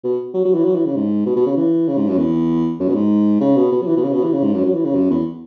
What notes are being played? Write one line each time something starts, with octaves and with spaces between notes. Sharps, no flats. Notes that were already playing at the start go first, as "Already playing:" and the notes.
B2
F#3
F#3
E3
F#3
E3
C#3
G#2
B2
B2
C#3
E3
C#3
G#2
F#2
E2
F#2
B2
G#2
C#3
B2
B2
F#3
E3
B2
C#3
B2
E3
C#3
G#2
F#2
F#3
E3
C#3
F#2
E2